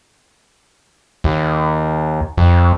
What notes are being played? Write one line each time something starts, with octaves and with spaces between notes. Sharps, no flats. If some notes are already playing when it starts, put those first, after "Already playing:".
D#2
F2